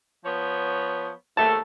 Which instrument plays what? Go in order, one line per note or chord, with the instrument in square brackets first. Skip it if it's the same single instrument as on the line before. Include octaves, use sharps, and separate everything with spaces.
[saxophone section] F3 B3 C#5
[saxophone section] D#2 G#2 A3 [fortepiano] A5